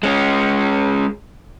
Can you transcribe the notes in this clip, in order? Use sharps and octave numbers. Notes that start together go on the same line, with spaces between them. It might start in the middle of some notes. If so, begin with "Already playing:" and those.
G#3 C#4